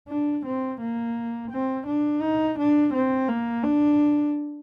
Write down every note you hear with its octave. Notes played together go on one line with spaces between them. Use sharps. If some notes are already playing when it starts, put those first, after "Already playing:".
D4
C4
A#3
C4
D4
D#4
D4
C4
A#3
D4